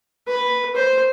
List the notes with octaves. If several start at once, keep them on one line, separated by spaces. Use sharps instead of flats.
B4
C5